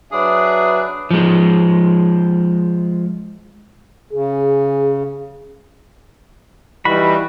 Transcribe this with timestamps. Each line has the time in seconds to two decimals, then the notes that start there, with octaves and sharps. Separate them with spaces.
0.12 F#3 D4 G#4 B4 E5
1.11 F3 G#3
4.12 C#3 G#4
6.85 E3 G3 D#4 F#4 B5